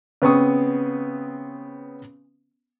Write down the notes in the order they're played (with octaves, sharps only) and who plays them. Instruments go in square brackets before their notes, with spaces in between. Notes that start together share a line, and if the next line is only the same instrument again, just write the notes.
[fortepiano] C#3 B3 C4 C#6 D#6